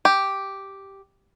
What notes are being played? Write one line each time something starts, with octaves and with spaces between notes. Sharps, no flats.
G4